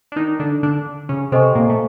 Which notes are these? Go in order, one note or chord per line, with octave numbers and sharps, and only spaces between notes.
D4
D#3 D#4
D3 D4
D3 D4
C#3 C#4
C3 C4 A4 C5 D#5 G#5 C#6
A#2 A#3
A3